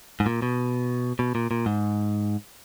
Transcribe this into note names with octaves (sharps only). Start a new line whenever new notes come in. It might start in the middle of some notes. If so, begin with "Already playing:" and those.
G#2
A#2
B2
B2
A#2
A#2
G#2